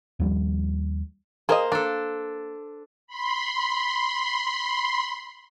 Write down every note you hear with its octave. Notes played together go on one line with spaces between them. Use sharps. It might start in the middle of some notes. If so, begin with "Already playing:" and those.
D#2 F3 G3
A#3 G#4 A#4 C5 D#5
A#3 D4 A4
B5 C6